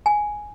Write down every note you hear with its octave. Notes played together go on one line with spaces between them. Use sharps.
G#5